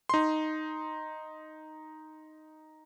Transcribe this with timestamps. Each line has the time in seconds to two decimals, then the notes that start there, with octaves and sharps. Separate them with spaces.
0.09 D#4 C6